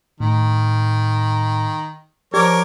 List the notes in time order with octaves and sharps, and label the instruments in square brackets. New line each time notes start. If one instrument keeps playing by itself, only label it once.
[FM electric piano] A2 [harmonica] D#3
[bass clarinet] F3 [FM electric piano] G4 D5 G#6 [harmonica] A#4 C#5 D6